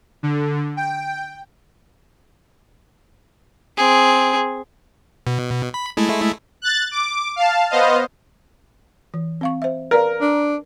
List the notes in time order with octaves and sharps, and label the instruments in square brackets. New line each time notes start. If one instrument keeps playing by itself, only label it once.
[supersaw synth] D3
G5
[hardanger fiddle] C4 G#4
[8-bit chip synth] B2
B5
G#3 A3 E4
[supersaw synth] F#6 A6
D6
F5 A5
B3 C5 D#5 F5
[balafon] E3
C4 F5 C#6
C5 E5
[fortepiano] A#4 [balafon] B4 D5 F5
[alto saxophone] D4